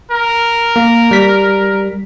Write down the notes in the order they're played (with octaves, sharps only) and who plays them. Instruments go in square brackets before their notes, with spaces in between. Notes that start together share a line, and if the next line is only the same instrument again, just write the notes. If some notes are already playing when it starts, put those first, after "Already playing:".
[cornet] A#4
[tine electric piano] A#3
G3 B6